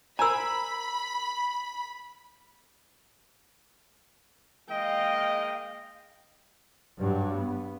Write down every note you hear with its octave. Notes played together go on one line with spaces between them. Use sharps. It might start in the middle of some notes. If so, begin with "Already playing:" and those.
A#4 C5 G#5 A#5 B5 E6
G#3 A#3 D#5 F5 G5
G2 F#3
B3